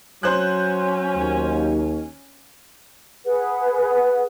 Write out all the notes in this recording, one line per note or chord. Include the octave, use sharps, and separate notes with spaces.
F#3 C#4 C5 F#6
D#2
G#4 B4 F#5